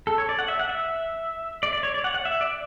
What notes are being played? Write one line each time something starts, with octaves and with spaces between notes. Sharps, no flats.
A4
C#5
D5
F#5
E5
F#5
E5
D5
D5
C#5
D5
F#5
F#5
E5
D5